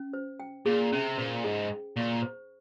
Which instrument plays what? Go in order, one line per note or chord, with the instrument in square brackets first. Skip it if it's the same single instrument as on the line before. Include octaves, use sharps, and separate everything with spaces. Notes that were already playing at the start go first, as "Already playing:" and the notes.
Already playing: [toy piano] C#4
C5
G5
[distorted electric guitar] A#2 [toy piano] G#4
[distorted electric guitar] C3 [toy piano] C#4
[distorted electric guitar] A#2 [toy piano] C5
[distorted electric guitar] G#2 [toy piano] G#4
[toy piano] G5
[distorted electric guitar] A#2 [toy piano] C#6
[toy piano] C5